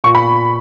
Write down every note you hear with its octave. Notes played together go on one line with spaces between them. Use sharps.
A#2 C#6
B5